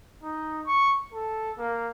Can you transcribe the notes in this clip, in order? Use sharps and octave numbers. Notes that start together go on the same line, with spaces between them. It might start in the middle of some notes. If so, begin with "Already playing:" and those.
D#4
C#6
A4
A#3